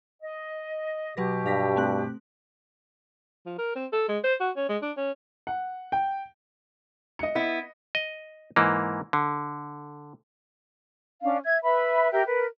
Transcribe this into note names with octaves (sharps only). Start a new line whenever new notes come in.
D#5
B2 F#3 G4 B4 A#6
G2 F5 A#6 B6
A3 C4 F#6
F3
A#4
C4
A4
G#3
C5
F#4
C#4
G#3
D4
C#4
F#5
G5
D#5 C#7
B3 E4
D#5
G#2 E3 A#3
D3
C#4 D4 F5
E5 G#6
B4 E5 B5
G4 A#4 E5 G5
A#4 B4